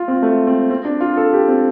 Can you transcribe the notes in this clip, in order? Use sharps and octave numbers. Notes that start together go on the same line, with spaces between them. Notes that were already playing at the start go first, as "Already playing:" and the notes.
Already playing: F4
C4
A3
C4
C4
D4
F4
A4
G4
C4